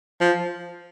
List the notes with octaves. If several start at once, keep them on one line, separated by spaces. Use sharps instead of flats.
F3